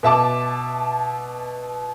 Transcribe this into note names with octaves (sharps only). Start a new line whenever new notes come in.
B2 E5 A5 D6